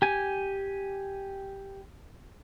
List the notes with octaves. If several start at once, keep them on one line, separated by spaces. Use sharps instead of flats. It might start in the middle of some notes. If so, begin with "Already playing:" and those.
G4 G#5